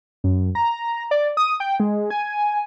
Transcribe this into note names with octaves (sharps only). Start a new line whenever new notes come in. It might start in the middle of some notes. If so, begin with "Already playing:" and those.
F#2
A#5
D5
D#6
G5
G#3
G#5